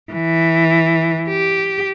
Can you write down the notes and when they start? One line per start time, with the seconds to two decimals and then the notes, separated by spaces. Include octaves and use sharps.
0.12 E3
1.28 G4